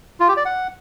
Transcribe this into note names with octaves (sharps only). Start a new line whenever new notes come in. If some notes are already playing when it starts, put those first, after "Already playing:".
F4
G4
D5
F#5